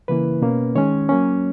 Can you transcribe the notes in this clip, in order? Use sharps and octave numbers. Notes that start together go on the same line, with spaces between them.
C#3 E3 A#3 E4 B4
B2 A#3 C#4
D#3 G#3 C#4 C#5
F#3 A#3 C#4